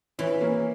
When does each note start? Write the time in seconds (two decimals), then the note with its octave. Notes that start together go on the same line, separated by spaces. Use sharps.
0.19 E3 C#4 E4
0.41 A#3 C#4